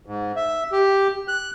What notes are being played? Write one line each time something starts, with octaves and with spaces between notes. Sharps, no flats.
G#2
E5
G4
F#6